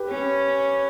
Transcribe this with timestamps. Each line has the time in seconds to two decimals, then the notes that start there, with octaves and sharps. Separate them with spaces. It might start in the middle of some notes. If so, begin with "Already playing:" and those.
Already playing: G4 B4
0.09 C#4